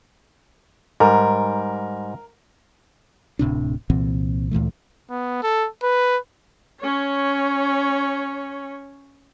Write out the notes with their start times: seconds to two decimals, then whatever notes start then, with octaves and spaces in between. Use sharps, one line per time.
1.00 G#2 G3 A#4
3.39 D1 A2 C3 D4
3.90 C2 A#2 E3 C4
4.51 D2 A#2 E3 A3
5.10 B3
5.43 A4
5.83 B4
6.81 C#4 C#5